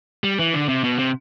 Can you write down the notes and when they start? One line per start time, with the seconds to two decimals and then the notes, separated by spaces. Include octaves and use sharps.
0.24 G3
0.39 E3
0.54 D3
0.69 C3
0.84 B2
0.99 C3